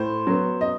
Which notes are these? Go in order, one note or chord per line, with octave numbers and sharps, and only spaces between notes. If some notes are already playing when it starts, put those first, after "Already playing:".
Already playing: A2 C5
F#3 B3
D#5